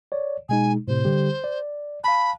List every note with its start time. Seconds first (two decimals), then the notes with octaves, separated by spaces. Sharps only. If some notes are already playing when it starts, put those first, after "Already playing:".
0.12 C#5 D5
0.49 B2 G#3 D#4 G#5
0.88 A2 C3 C5
1.05 D3 G3 G4
1.44 D5
2.04 F5 A5 B5